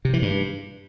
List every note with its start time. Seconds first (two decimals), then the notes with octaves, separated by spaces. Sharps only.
0.05 C3
0.13 E3
0.22 G2